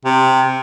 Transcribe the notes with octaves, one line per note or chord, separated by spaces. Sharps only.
C3